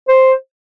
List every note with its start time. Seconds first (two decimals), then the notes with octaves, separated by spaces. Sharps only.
0.08 C5